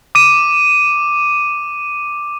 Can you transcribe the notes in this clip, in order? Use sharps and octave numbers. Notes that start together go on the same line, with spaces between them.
D6 D#7